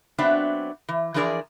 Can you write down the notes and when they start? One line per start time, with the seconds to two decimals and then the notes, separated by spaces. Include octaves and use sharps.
0.18 F#3 B3 C4 D4 E5
0.88 E3
1.14 E3 F3 D4 G#4 A#4 D5